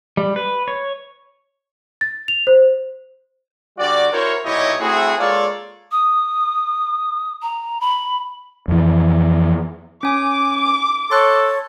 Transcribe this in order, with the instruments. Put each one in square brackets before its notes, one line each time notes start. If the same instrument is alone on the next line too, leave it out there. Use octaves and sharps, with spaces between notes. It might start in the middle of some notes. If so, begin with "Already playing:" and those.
[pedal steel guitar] G3
B4
C#5
[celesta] A6
F7
C5
[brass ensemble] D3 G3 F#4 D5
E4 F#4 A#4 C5 C#5
B1 A#2 E4 G4 C#5 D#5
A3 C4 E4 F#4 G#4
G#3 A#3 F4 A4 C#5 D5
[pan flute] D#6
A#5
B5
[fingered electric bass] F2 E3
[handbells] C#4 G#5 [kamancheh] D6
[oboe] A4 [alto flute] C#5 [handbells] C6 F#6